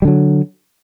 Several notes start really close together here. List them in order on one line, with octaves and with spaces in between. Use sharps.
G3 D3 F#3